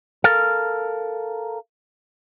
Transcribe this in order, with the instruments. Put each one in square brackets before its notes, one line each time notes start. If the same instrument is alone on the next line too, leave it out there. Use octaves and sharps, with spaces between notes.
[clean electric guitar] A4 A#4 F5